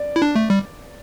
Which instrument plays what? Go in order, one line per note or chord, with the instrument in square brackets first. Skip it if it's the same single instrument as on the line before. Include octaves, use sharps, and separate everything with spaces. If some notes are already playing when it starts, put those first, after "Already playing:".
Already playing: [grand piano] D5
[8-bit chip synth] E4
D4
A3
G3